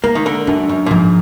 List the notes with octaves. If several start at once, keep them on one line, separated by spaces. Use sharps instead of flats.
G#3 A#3
D#3
D3
F#2 D4
F#2
A#2
G#2 F3